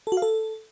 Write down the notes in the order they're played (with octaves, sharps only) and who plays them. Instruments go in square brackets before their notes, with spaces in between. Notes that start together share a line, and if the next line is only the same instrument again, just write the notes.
[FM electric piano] A4
F#4
F5
A4